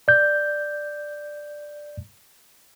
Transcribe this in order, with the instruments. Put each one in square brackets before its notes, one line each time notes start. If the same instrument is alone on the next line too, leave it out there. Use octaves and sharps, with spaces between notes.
[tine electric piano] D5 G6